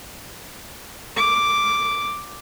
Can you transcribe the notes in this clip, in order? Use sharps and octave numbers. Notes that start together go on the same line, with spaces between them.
D6